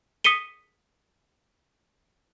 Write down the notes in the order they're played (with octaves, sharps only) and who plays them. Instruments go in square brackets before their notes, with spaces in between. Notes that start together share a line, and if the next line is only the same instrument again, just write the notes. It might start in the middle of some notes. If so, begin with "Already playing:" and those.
[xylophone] D#6 B6 C#7 D#7 G7